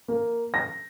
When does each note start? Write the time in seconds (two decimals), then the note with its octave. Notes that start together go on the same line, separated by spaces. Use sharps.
0.08 A#3
0.54 A#6